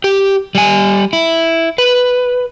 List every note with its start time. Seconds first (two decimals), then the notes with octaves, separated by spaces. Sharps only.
0.04 G4
0.55 G3 G#5
1.13 E4
1.78 B4